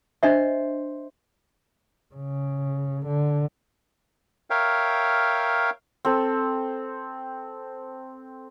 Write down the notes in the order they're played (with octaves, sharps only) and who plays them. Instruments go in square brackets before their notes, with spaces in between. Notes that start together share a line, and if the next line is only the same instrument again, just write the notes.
[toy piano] D4 D#5 E5 [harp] C5
[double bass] C#3
D3
[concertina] A#4 C#5 E5 F5 G5
[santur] C4 A4